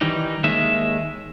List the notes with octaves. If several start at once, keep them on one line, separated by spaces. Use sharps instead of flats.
D#3 E3 G3 D#4
D#2 D#3 G#3 E5